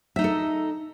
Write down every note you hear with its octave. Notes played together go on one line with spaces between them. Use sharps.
D#4 A4 D#5 E5